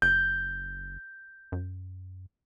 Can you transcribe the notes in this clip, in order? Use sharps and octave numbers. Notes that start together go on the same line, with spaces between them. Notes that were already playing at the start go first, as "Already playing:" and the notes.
F#1 G6
F#2